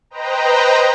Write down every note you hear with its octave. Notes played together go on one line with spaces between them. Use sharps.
B4 C5 D#5 G5 A#5